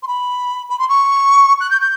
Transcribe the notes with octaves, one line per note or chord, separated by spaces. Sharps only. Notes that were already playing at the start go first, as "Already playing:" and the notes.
C6
B5
B5
C6
C#6
F#6
G6
G6